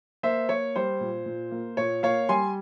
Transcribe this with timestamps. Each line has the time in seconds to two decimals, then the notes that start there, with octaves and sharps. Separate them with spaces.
0.23 A#3 C5 E5
0.49 A#3 C#5
0.76 G3 C5
1.01 A#2
1.26 A#2
1.52 A#3
1.77 A#2 C#5
2.03 A#3 C#5 F5
2.29 G3 G#5 C6